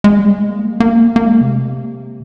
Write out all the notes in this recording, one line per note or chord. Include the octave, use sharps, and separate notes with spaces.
G#3
G3
G#3
A#3
G#3
A#3
A#3
A#3
G#3
C3